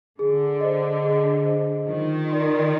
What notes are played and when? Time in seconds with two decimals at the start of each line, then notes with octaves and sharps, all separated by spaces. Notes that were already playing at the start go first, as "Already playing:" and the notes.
0.19 D3 G#4
0.61 C5 D#5
1.04 G#4
1.45 C5 D#5
1.87 D#3 F4
2.30 A#4 D5 G5 C6